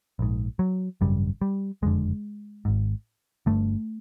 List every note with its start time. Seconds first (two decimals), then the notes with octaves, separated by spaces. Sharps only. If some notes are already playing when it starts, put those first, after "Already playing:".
0.19 A#1 G#2
0.59 F#3
1.01 G#1 F#2 C#3 G3
1.41 G3
1.82 F#1 F2 D3 G#3
2.65 G#1 G#2
3.46 G1 G2 D3 A3